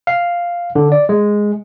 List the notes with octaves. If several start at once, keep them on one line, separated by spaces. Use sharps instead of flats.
F5
D3
D5
G#3